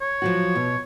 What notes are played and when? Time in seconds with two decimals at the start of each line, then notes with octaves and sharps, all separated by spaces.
0.01 C#5
0.22 F3 F#3 F#4
0.55 B2